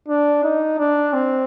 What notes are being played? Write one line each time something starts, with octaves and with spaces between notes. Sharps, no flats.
D4
D#4
D4
C4